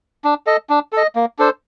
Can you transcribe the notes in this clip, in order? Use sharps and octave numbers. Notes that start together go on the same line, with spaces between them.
D4
A4 D#5
D4
A4 D#5
A#3
D4 A4 C5